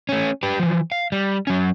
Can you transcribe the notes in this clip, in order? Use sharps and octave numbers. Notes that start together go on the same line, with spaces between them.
A3 C#4
G4 B4
E3 F3
F5
G3
F#3 C#4